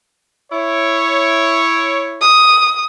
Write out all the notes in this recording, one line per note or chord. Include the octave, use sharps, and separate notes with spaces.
E4 C#5
D#6